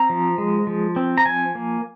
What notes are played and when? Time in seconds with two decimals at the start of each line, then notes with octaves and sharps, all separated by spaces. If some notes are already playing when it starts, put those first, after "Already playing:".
Already playing: C4 A#5
0.10 F3
0.38 G#3
0.67 F3
0.96 C4
1.18 A#5
1.26 F3 G#5
1.55 A#3